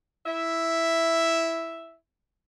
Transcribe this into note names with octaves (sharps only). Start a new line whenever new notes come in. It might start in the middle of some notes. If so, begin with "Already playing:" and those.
E4 E5